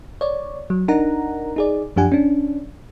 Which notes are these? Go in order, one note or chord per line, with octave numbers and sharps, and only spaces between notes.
C#5 D5
F#3
D4 D#4 A#4 F#5 A#5
D#4 G#4 D5
F#2 F3 D4 G4 F#5 G#5
C#4 D4